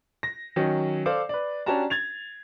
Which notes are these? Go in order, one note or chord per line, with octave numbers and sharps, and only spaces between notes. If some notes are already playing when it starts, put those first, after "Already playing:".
A#6
D#3 F#3 C#4
A4 C5 D5 F5 D6
B4 D5
C#4 D4 F#4 G4 A5 A#5
G#6 A6 F7